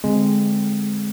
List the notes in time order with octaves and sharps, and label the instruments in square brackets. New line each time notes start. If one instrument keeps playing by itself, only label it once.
[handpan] D3 C4 [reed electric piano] G#3